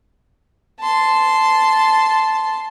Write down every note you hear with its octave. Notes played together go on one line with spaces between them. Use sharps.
A5 C6